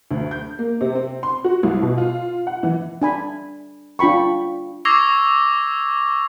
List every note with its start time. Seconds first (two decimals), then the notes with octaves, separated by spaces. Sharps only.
0.11 D2
0.31 G6
0.59 A#3
0.81 C3
0.95 C4
1.23 C6
1.44 F#4
1.63 C2
1.82 B2
1.98 F4
2.47 F#5
2.63 E3
3.02 D4 G#5 B5
3.99 D4 F4 G5 B5 C#6
4.85 C#6 D6 E6 G#6 A#6 C7